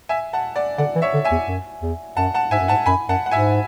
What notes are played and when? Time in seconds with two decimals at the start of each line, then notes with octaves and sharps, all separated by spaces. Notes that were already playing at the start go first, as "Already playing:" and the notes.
0.09 E5 G#5
0.33 F#5 A5
0.56 D5 F#5
0.78 D3 D5 F#5
0.96 E3
1.02 C#5 E5
1.14 D3
1.24 E5 G#5
1.31 E2
1.48 F#2
1.82 E2
2.16 F#2 F#5 A5
2.34 F#5 A5
2.51 G#2 E5 G#5
2.60 F#2
2.68 G#2 F#5 A5
2.86 F#2 G#5 B5
3.09 F#2 F#5 A5
3.26 F#5
3.31 G#2 E5 G#5